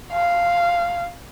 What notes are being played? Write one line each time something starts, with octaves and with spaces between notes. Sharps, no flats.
F5